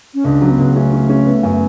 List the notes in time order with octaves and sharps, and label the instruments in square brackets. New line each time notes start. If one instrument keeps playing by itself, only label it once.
[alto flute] C#4
[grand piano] C#2 [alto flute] D4
[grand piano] F#3
[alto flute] B3
[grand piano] C#2
[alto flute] A3 [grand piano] C#4
[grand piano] C#4
C#4
B3
F#2